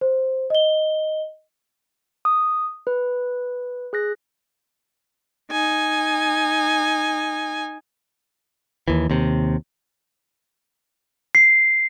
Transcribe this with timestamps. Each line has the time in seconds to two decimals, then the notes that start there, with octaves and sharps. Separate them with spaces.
0.01 C5
0.50 D#5 G7
2.25 D#6
2.87 B4
3.93 G#4 F#6 A#6
5.51 D#4 G#5
8.88 D#2 E3
9.10 D#2 C3
11.35 C7